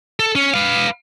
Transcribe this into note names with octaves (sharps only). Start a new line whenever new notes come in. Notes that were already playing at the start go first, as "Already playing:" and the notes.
A4
C#4
B4 F5